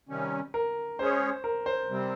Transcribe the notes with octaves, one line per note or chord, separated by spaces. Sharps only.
C3 D#3 G3 C#4
A#4
G#3 C#4 G#4 C5 C#5
A#4
C5
C3 G3 C4